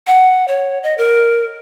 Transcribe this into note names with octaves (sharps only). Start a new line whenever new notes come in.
F#5
C#5
D#5
A#4